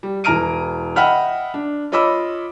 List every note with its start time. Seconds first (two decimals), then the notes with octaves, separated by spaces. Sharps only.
0.03 G3
0.24 E1 E4 A#5 F6 D7 D#7
0.96 D#5 E5 F#5 G5 B5 F6
1.54 D4
1.92 F4 C#5 D#5 B5 D6 E6